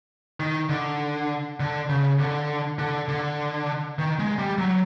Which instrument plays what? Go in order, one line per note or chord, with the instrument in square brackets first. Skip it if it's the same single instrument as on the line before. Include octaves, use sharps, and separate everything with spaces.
[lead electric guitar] D#3
D3
D3
C#3
D3
D3
D3
D#3
G#3
G3
F#3